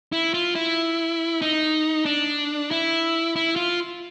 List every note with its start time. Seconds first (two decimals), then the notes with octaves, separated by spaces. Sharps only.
0.12 E4
0.34 F4
0.55 E4
1.42 D#4
2.06 D4
2.71 E4
3.36 E4
3.56 F4